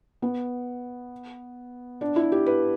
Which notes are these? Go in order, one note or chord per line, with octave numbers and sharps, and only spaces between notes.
B3
D4
E4
G4
B4